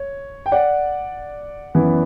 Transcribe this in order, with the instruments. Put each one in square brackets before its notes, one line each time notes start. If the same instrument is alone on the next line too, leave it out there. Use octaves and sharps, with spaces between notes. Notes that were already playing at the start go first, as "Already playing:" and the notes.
Already playing: [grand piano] C#5
G5
D5 F#5
F#2 E3 B3